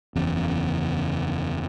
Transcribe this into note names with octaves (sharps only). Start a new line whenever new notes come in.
F#1 E2 C#3